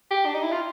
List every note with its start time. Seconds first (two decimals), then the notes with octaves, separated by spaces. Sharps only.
0.11 G4
0.26 D4
0.34 D#4
0.43 E4
0.52 F4